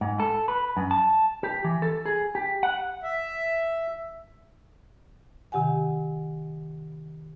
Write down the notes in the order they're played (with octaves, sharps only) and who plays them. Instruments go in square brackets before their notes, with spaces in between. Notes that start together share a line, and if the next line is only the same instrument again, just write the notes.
[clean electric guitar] G#2
A4
B4
F#2
A5
G4
E3
A4
G#4
G4
F#5
[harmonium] E5
[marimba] C3 D#3 G4 F#5 G#5